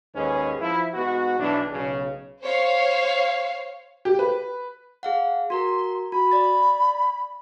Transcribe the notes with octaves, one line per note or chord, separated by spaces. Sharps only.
D#2 G#2 C#4 G#4 B4
F3 E4
G#2 B3 F#4
B1 E3 D4
B1 C#3
C5 C#5 F5
G4
B4
G#4 F5 F#5
F#4 A#4 A#5 C6
F#4 B5
D5 A6